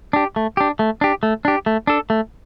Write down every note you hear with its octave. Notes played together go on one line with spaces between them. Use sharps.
D4 G4
A3
D4 G4
A3
D4 G4
A3
D4 G4
A3
D4 A4
A3